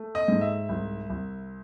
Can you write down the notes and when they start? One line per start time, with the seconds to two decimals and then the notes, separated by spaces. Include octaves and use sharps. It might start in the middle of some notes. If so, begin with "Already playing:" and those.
Already playing: A3
0.15 D#5
0.28 G#2
0.41 E5
0.69 C2
1.10 C2